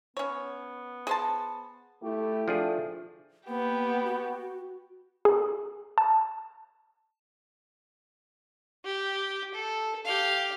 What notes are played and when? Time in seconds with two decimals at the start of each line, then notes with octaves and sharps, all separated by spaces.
0.17 B3 C#4 C#5
1.07 G#4 C5 A5
2.03 A3 E4 G4
2.48 F3 A3 D4 G#4
3.48 A#3 B3 G4
4.06 F#4
5.25 G#4
5.98 A5
8.84 G4
9.54 A4
10.05 G4 F5